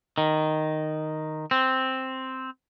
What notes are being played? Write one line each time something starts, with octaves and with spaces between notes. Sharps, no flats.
D#3
C4